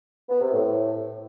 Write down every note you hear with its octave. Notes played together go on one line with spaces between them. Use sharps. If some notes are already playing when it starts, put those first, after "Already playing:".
B3
C3
A2